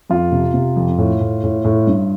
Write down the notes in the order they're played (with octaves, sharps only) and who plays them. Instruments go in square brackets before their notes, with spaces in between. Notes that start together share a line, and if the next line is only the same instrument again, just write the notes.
[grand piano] F2 F4
C3
C3
F2
A2
A2
A2
A2
G2